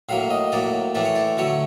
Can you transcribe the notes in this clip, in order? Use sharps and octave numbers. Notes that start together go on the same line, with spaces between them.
A2 F#3 A#3 F5
D#5
A2 F#3 A#3 D5
A2 E3 A3 D5
C#5
D5
D3 F#3 A3 C#5